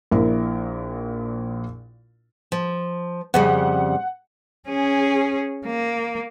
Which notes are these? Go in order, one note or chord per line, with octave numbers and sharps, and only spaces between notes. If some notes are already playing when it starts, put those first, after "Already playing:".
A#1 A#2 E4 A#4
F3
F2 C#3 G3 F#5
C#4 G#4
A#3